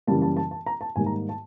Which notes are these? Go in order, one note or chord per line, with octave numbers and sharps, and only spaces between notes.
F#2 C#3 E3 G3 A#3 A5
A5
A5
A5
A#5
A5
G#2 D#3 G3 A#3 G#5
A#5
A5